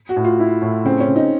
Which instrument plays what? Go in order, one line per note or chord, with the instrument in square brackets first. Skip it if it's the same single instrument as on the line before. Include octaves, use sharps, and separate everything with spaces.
[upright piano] F#4
[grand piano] A2
[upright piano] F4
[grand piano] E4
A2
[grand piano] C#3 [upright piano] C4
[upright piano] C#4
[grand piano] C#3
[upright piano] D#4